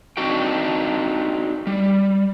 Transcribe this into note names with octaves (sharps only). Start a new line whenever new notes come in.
C4 D4 D#4 F#4 G5
G3